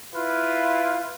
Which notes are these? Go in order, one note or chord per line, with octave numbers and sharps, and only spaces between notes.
E4 F4 B4 F5